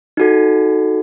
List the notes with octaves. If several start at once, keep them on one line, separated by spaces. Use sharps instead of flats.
D#4 F#4 A4